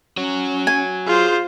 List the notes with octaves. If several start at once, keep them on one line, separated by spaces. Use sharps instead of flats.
C#4 F#4 C#5
G#5
F4 G#4 C5